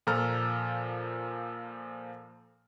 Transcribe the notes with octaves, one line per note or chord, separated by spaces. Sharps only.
A#2 F3 A4 A#5 F6